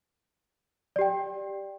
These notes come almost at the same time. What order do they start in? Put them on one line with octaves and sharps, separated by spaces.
D5 G4 G5